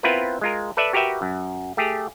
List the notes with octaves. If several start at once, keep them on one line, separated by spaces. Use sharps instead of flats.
B3 C4 E4 F4 A#4 B4
G#3 F4 A#4
A4 B4 D5 E5
F#4 G4 A#4 B4 E5 G5
F#2
A3 G4 G#4